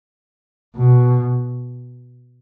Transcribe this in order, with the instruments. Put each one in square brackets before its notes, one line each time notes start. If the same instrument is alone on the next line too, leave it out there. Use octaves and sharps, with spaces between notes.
[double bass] B2